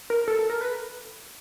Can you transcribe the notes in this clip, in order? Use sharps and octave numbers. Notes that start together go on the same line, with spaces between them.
A#4
A4
A4
A#4
B4